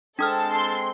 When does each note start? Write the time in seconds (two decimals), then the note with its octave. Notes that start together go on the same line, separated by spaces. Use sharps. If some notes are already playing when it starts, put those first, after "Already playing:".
0.19 G#3 C4 D4 A4 A5 D#6 F6
0.52 C6